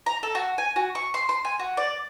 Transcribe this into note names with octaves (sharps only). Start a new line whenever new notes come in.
A#5
A4
F#4
G#5
F#4
C#6
C6
C6
G#5
F#4
D5